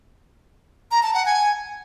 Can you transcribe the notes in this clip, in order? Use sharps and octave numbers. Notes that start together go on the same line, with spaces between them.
A#5
A5
F#5
G#5